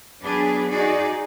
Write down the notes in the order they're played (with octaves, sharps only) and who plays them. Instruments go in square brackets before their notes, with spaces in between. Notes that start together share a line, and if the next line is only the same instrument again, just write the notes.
[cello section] F#3 B3 D4 G#4 B4
D#4 F#4 G#4 D5